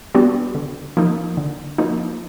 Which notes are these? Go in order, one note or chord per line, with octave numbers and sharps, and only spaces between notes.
G3 B3 D4 F#4
D3
F3 A#3 D#4
D3
F3 A#3 D#4